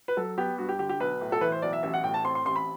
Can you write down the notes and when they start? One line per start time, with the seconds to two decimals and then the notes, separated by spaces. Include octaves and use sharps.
0.08 B4
0.17 F#3 A4
0.38 B3 G4
0.58 G2 F#4
0.69 G4
0.79 D3 G4
0.89 G4
1.00 B1 B4
1.21 A2
1.32 A4
1.41 E3 B4
1.52 C5
1.62 B1 D5
1.73 E5
1.83 A1 E5
1.94 F#5
2.04 A2 G5
2.14 A5
2.25 C4 C6
2.35 C6
2.45 A1 C6
2.56 B5